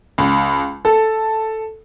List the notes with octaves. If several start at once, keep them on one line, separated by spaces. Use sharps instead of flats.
C#2
A4